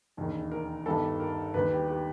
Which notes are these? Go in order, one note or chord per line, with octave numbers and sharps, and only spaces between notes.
E1 D#2 D#3
A#4
G1 G2 D#3 G3 A4
A#4
D#2 D#3 G3 B4
G4
G4